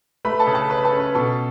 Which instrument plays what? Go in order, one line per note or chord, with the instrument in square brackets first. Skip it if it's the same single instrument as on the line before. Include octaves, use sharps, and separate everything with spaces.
[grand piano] A3 B4 B5
A4 A5
C#3
A4 A5
C#3 B4 B5
A4 A5
C#4
B4 B5
B2 A4 A5